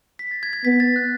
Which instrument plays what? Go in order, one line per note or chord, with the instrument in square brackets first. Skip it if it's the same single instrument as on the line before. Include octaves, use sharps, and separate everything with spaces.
[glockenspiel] B6
A6
G#6
G#6
[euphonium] B3 [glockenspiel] B6
[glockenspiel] A6
F#6